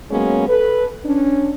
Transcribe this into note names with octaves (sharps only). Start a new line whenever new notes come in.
F#3 G#3 A#3 B3 C#4
A4 B4
C#4 D4